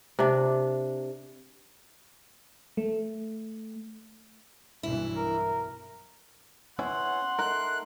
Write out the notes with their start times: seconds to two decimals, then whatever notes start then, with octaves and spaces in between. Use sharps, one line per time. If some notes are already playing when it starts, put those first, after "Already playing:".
0.19 C3 D4
2.77 A3
4.83 B1 G2 E3 E4
5.15 A#4
6.79 B3 C#4 E4 F#5 C6
7.39 A3 D#4 A#4 F#6